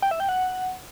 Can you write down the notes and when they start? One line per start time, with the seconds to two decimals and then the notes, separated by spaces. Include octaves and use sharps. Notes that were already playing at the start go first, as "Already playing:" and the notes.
0.02 G5
0.11 E5
0.20 G5
0.29 F#5